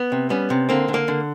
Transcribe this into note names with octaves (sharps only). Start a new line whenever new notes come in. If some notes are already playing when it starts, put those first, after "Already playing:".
Already playing: B3
C3
G3 B3 C#4
C3
D3 A#3 C4
D3
A#3
D3